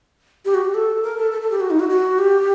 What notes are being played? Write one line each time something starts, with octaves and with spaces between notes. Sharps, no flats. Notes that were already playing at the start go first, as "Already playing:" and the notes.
G4
F#4
G4
A4
A#4
A4
A4
A4
G4
F#4
D#4
F#4
F#4
G4